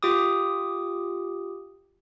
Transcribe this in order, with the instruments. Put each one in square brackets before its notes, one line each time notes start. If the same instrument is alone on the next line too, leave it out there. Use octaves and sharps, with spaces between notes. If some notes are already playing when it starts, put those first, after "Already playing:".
[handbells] F4 G4 D6 D#6